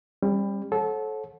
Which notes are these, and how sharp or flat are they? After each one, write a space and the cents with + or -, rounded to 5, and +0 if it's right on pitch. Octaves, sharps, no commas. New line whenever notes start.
G3 +25 C#4 -35
A4 -25 C#5 -40 F#5 -30